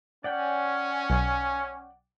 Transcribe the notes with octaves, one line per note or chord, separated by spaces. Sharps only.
C#4 D5 F#5 G5
B1